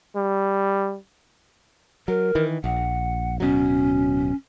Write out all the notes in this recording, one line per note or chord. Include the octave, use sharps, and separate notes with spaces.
G3
F#3 A#4
D#3 E3
A#1 F#5
D1 B2 F#3 C#4